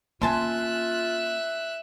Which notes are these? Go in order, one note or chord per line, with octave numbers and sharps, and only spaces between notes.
A#3 C#4 F4 E5 G#5 A5 C6 F#6